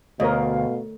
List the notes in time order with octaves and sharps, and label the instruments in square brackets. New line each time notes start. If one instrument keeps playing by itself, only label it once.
[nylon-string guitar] D2 [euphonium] B2 [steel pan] A#4 C#5 D#5 [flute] F5